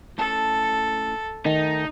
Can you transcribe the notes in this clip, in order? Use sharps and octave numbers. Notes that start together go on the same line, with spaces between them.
A2 C#4 A4 A5
D#3 A3 D#4